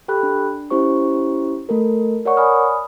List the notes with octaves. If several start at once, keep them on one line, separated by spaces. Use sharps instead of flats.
G4 A4 G5 B5 F#6
D4
C#4 E4 G4 C5 C#6
A3 A4 A#4
A#4 C#5 D5 F#5 C#6
D5 G#5 B5 D#6 F6